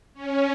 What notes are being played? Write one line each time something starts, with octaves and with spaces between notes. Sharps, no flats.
C#4